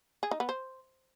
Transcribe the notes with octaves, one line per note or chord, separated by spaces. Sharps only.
G#4
D#4
B3
C5